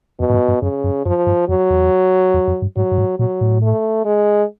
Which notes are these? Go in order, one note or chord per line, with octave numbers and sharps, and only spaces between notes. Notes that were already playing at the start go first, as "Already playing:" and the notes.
F2 B2
G#2
G2
G2
F#2 C#3
F#2
F#2 F3
G2
F2 F#3
E2
E2
F2
G2
G#2 F#3
G2
G#2
A#2 F#3
A2
A3
G#3